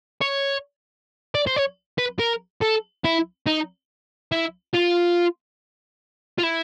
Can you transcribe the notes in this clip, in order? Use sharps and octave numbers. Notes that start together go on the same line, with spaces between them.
C#5
D5
C5
C#5
B4
A#4
A4
E4
D#4
E4
F4
F4
E4